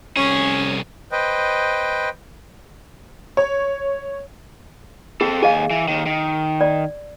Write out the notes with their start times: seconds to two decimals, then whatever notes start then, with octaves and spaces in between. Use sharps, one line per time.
0.17 C2 C#4 G#4
1.12 B4 C5 D#5 G5
3.37 C#5
5.21 C4 G#4 A4
5.42 D#2 G#4 D#5 F5 G#5
5.71 E3
5.88 D#2 D#3
6.06 D#3
6.61 D5